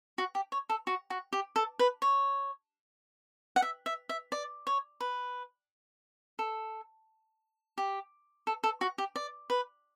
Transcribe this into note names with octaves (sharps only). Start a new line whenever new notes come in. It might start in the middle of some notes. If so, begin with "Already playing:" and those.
F#4
G4
C#5
A4
F#4
F#4
G4
A4
B4
C#5
F#5
E5
E5
E5
D5
C#5
B4
A4
G4
A4
A4
F#4
G4
D5
B4